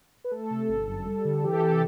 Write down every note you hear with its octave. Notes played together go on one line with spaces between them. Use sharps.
B4
A3 A4
C3
G1
F#2
G3
D3
E3 G4
A4
C3 G4
A4